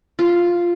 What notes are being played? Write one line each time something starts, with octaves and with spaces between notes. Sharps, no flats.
F4